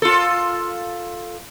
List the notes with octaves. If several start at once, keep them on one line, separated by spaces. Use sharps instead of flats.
F4 A4